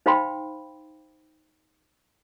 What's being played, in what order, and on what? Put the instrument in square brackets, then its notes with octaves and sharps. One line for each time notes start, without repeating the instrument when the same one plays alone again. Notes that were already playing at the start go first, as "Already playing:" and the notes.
[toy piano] D#4 C5 F5 G5 B5 C6